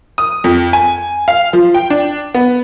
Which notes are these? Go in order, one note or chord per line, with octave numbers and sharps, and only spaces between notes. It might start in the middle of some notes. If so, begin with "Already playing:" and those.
D#6
F2
G#5
F5
F3
G5
D4
B3